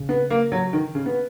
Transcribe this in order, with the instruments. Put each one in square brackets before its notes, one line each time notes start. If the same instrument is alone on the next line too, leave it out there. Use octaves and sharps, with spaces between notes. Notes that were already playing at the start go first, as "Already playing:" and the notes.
Already playing: [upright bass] C#3
[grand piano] B3
A#3
F#3
D#3
C#3
B3